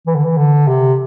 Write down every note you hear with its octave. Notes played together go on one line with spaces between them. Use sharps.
E3
D3
E3
D3
C3